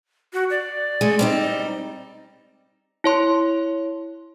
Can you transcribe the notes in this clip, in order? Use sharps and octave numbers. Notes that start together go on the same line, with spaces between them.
F#4
D5
G#3 A3
G3 C4 D#4
E4 C#5 C6